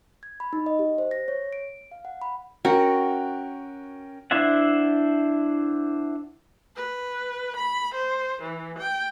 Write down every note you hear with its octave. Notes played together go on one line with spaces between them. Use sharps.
G#6
B5
D#4
D#5
G4
C5
A#6
C#5
D7
F5
F#5
B5
C#4 F#4 A#4 G5
D4 E4 C5 E5 F#5
B4
B5
C5
E3
G5